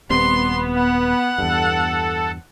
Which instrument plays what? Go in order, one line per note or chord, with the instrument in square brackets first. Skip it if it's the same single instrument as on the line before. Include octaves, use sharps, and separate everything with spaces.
[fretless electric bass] D#1 G3 C4 [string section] B3 [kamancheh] C6
[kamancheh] F#5
[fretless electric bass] E2 G2 [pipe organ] A4